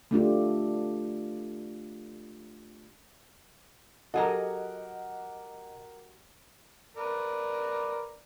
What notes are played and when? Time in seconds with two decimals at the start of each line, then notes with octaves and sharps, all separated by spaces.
0.11 A3 D4 F4 G4
4.14 F#3 G4 A4 A#4 D#5 F#5 G#5 A#5
6.97 A#4 B4 D5